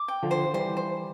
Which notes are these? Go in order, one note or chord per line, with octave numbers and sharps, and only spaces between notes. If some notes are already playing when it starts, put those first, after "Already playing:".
Already playing: D6
G5
D3 F3
C5
E3 G3 C5
C5